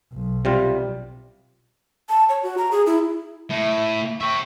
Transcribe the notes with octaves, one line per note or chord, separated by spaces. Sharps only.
B1
C3 G3 F4
A5
C#5
F#4
A#5
G#4
E4
A2 E5
E5 G5 C#6